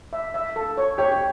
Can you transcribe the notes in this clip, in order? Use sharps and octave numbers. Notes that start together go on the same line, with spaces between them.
E5
E5
A4
C#5
G4 C#5
G4